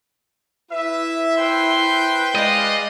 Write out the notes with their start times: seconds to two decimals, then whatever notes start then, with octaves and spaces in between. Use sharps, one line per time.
0.71 E4 B4 E5
1.38 B4 C5 G5 C6
2.35 G#3 D5 D#5 F5